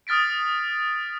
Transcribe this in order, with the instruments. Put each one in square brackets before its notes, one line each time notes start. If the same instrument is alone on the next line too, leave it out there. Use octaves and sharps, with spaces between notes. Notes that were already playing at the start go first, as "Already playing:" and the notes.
[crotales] D#6 F6 A6 B6 D7